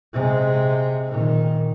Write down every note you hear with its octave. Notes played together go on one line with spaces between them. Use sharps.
C3 G#3
A#2 D#3